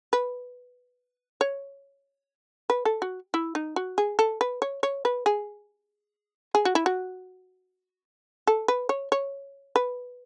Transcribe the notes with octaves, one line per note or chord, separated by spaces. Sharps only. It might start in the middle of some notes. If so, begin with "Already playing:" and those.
B4
C#5
B4
A4
F#4
E4
D#4
F#4
G#4
A4
B4
C#5
C#5
B4
G#4
G#4
F#4
E4
F#4
A4
B4
C#5
C#5
B4